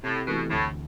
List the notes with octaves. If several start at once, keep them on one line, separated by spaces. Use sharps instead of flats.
A2 C3
B2 E3 A3 E4
D2 A2